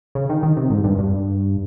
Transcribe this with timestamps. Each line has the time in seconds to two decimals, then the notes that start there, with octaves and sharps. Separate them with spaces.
0.15 C#3
0.30 D#3
0.43 D#3
0.57 C3
0.70 G#2
0.84 G2
0.98 G2